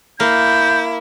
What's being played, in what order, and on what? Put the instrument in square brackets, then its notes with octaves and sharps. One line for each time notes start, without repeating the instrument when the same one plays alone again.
[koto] A#3 [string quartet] E4 [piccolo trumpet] G6